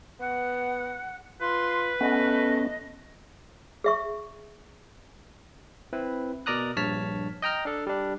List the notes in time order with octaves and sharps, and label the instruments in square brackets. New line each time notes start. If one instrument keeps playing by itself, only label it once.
[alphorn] B3 [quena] F#5
[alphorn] F4 [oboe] B4 [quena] C6
[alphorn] A3 [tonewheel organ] B3 C#4 [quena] D#5
[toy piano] G#4 E5 C#6
[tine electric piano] C4 E4 B4
B2 A#4 D5 A#5 D#6 F#6
A#1 G2 C#5 A5 F6 B6
D#5 G5 A#5 F6
D4 A4
G3 D4